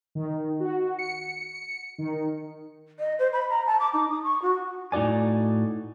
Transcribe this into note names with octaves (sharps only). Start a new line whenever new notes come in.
D#3
F#4
C#7
D#3
D#5
C5
B5
A#5
A5
D6
D#4
D#6
C#6
F#4
A2 D#4 F#4 D5 G#5